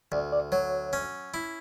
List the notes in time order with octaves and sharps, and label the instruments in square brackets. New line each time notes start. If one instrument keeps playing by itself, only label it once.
[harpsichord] D2 [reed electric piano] D5
[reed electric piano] D5
[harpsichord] F#3 [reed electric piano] C#5
[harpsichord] C#4
E4